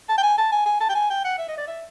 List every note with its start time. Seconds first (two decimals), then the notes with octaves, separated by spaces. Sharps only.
0.09 A5
0.18 G5
0.23 G#5
0.38 A5
0.52 G#5
0.66 G#5
0.81 A5
0.89 G5
0.95 G#5
1.10 G5
1.25 F#5
1.38 E5
1.48 D#5
1.58 D5
1.67 E5